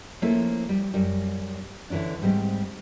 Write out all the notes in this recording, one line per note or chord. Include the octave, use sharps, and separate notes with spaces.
F3 A3 A#3 C#4 E4 A4
G3
F#2 G3
D3 E3 F#3 C#4 D4
G#2 G3 C4